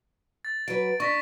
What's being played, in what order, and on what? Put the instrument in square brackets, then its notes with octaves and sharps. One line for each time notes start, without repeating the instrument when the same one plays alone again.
[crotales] A6
[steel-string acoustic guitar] F#3 B4 [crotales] D7
[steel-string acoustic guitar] D4 [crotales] C#6 A#6 B6